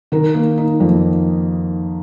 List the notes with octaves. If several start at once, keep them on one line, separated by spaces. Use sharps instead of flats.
D#3 A#4
A#3
D#4
F2